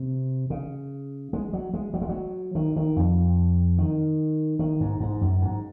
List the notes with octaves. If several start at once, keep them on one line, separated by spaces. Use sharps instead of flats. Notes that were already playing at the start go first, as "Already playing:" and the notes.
Already playing: C3
C#3
G#3
F#3
G#3
F#3
G#3
F#3
D#3
D#3
F2
D#3
D#3
G#2
G#2
F#2
G#2